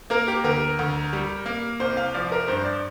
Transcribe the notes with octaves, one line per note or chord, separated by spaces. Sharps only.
A#3 A#4
G4
D2 A#4
D2
G3
A#3
C2 C5
F5
F3 D5
A#4
G2 C5
D5